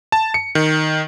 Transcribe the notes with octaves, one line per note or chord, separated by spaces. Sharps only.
A5
C#7
D#3